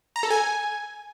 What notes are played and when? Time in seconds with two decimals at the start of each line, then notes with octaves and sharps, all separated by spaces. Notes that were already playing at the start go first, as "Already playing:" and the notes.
0.16 A#5
0.23 A4
0.31 G#5